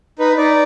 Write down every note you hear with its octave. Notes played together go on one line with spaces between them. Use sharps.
D#4 B4
D#4 D5